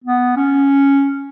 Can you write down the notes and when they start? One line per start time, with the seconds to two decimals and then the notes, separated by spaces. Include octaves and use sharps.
0.04 B3
0.37 C#4